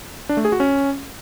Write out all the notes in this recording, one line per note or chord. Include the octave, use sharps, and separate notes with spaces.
D4
A3
G#4
F#4
C#4